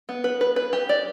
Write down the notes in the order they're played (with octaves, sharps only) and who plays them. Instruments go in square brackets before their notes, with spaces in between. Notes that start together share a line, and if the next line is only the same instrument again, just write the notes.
[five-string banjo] B3
B4
B4
B4
G4
D5